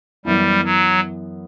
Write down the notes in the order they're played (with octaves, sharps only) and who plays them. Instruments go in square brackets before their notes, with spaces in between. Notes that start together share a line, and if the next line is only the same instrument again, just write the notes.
[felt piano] F#2 E3 B3 E4 [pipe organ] G3
[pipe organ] F#3